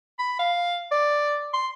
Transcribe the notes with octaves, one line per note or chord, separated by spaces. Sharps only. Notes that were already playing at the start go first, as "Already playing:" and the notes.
B5
F5
D5
C6